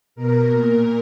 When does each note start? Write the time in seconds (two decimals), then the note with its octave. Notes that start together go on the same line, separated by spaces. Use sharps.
0.15 B2 A#4
0.50 A#2